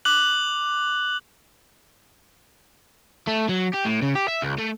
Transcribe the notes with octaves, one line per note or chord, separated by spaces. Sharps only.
D6 F#6 F#7
A3
F#3
G4
A2
C#3
G4
E5
C#2
A3